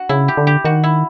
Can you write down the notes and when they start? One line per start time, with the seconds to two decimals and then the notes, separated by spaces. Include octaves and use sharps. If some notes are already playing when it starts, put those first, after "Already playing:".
Already playing: F#4
0.09 C#3 E4
0.28 G4
0.37 D3
0.47 G4
0.65 D#3 F#4
0.84 E4